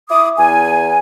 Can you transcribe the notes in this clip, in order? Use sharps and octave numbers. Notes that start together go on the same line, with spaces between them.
E4 E5 D6 D#6
E2 G#5